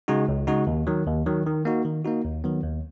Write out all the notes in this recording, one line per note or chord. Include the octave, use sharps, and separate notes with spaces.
C#3 G#3 D#4 F#4
C#2
C#3 G#3 D#4 F#4
D#2
D#3 F#3
D#2
D#3 F#3
D#3
A#3 D#4 F#4
D#3
A#3 D#4 F#4
D#2
D#3 F#3 B3
D#2